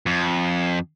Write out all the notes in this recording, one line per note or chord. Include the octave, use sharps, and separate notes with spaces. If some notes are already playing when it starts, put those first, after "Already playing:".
F2